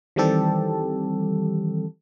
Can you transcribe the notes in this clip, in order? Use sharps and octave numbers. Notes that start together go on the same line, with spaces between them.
D#3 E3 G3 C4 G4 A4